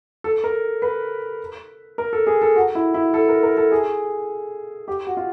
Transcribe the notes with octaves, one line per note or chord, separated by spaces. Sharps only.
A4
A#4
B4
A#4
A4
G#4
A4
F#4
E4
E4
A4
A#4
A#4
A4
G#4
G4
F#4
F4